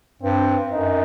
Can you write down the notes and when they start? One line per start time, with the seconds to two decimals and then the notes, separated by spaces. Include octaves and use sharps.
0.22 G2 C4
0.71 F#2 D#4